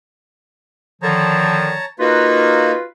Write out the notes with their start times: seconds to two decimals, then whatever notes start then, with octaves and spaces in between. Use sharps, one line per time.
1.02 D3 D#3 F3 C#5 A5 A#5
2.00 A#3 D#4 F4 F#4 B4